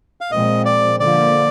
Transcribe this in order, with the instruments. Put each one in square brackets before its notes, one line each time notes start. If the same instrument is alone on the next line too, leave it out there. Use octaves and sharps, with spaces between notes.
[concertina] F5
[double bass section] A#2 F3 G#3 C4 [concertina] D#5
[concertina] D5
[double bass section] D3 F3 A#3 [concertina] D5